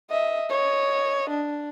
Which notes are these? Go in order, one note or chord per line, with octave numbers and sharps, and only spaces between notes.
D#5 E5
C#5 D#5
D4